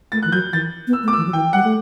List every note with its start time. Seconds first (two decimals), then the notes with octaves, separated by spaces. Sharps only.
0.12 A3 A6
0.23 E3 F#6
0.32 F#3 G6
0.52 E3 A6
0.87 B3
0.93 E6
1.03 A3
1.08 D6
1.13 E3 E6
1.26 F#3
1.33 E3 G5
1.53 G3 F#5
1.64 A3